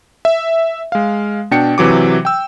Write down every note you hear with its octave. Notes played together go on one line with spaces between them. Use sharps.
E5
G#3 F5
B2 D4 G5 C#7
C3 E3 F#3 D6
G5 E6